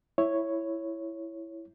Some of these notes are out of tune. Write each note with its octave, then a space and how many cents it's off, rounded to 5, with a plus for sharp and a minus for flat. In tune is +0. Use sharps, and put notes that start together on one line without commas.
E4 +5 C#5 +0